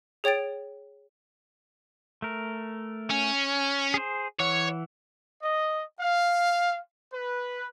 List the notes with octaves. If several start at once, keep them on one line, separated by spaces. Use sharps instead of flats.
G#4 C#5 G5 A6 D7
A3 A#4
C#4
G#4 C5
E3 C#5 F#5
D#5
F5
B4